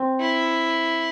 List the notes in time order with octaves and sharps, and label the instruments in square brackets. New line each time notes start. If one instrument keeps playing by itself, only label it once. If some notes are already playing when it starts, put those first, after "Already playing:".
Already playing: [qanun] C4
[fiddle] E4